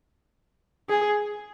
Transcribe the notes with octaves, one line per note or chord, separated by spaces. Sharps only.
G#4